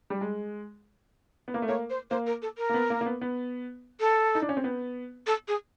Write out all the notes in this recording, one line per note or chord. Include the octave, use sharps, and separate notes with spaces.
G3
G#3
B3
A#3
A3
A#3 C#5
C5
A#3 C5
A#4
A4
A#4
A#3
B3
A#3
A#3
B3
B3
A4
D#4
D4
C#4
C4
B3
A4
G#4